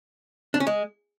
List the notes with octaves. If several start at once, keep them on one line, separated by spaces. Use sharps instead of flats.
D4
C#4
G#3